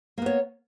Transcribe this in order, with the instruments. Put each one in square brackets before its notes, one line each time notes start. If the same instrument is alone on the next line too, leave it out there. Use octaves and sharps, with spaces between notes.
[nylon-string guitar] A#3
B3
C#5